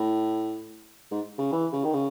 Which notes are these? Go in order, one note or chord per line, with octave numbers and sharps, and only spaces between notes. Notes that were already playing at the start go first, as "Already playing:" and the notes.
Already playing: A2
G#2
C#3
E3
C#3
D#3
C#3